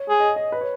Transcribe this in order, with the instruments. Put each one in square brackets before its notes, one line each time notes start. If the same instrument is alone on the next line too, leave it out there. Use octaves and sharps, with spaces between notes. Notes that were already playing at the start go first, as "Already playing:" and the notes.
Already playing: [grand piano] C#5
[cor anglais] G#4
[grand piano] D#5
D#5
B4
C#5